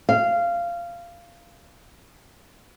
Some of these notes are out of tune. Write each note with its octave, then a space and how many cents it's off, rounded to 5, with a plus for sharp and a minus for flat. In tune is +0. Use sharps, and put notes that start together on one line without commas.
F5 -15